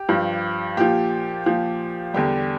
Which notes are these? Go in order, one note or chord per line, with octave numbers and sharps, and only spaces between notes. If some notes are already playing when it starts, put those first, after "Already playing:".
Already playing: G4
G2 F3
A#2 F3 G4
A#2 F3
E2 D3 G3 G4